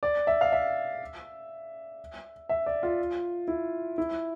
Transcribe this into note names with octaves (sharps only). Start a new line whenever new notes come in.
D5
E5
F5
E5
E5
D5
F4
E4
E4